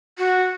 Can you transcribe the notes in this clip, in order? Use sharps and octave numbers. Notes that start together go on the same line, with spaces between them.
F#4